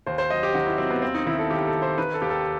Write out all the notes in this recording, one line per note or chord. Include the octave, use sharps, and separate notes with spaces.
D#2 C5
C5
F#3 D#5
G4
D#3 F#4
E4
F#3 C4
B3
D#2 C4
D#4
D#3 E4
A4
D#2 G4
A4
D#2
C5
D#3 B4
A4
D#2 G4
A4